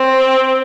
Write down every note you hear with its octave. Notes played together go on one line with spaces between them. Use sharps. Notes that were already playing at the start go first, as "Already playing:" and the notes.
Already playing: C4